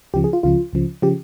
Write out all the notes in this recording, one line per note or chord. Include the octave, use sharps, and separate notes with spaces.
C#2 C#3 F3 G4
G#4
F4
C#2 C#3 F3 F4
C#2 C#3 F3
C#3 F3 G4